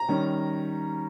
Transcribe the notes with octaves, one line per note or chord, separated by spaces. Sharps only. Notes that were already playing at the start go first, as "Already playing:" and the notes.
Already playing: A#5
D#3 G3 C#4